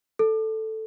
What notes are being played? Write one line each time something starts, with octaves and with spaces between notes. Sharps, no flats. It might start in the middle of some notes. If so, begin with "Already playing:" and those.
A4